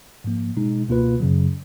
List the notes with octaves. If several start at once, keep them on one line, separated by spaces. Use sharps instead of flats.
G#2 F3 A#3
B2 G#3 D#4
C#2 B2 A#3 F4 B4
F#2 C#3 F#3